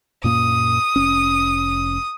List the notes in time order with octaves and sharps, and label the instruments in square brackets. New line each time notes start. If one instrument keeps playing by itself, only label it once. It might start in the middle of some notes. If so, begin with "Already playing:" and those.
[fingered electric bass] F#2 A#2 A#3 [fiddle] D#6
[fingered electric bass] F1 C#4